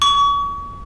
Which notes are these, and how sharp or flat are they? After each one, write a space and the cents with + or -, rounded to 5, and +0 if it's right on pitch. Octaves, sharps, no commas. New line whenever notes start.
C#6 +35